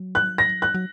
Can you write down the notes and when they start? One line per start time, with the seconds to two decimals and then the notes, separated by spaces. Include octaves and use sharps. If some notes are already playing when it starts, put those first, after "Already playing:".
Already playing: F#3
0.15 F#6
0.38 A#6
0.62 F#6
0.74 F#3